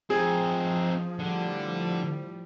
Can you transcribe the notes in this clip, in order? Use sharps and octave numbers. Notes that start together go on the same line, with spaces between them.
F3 C4 D#4 G#4
A2 D3 G3